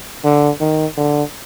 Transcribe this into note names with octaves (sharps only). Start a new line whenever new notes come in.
D3
D#3
D3